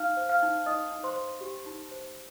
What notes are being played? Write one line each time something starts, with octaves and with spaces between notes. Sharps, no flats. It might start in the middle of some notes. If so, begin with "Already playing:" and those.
Already playing: D#4 F5 F6
C5
F5 F6
D#4
D#4 D#5 D#6
D#4
C5 C6
C5
G4
D#4
C5